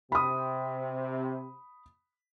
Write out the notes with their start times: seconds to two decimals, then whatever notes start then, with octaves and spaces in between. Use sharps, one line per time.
0.12 C3 B5 D#6